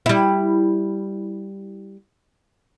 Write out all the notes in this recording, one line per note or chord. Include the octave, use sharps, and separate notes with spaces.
G3 E4